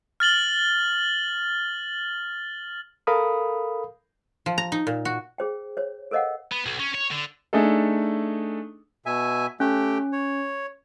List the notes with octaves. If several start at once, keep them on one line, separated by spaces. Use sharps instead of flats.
F6 A6 F#7 G7
A4 A#4 F5 B5 D#6
F3
A#5
D#4
A#2
F#4
G#4 C5 G5
C5 C#5
A4 A#4 C5 D#5 F5 F#5
B3
B1
C#4
C#5
D3
A3 D4 D#4 G#4 A4
B2 E5 G#5
A3 C#4 G4 G5
C#5